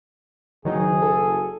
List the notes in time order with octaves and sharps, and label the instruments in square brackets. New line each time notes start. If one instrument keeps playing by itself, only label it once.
[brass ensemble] F#1 G#4 [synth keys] D#3 F#3 D#4
[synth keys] A4